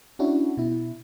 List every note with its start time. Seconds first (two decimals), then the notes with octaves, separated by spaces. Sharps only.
0.19 C#4 D4 E4 F#4
0.57 B2 E4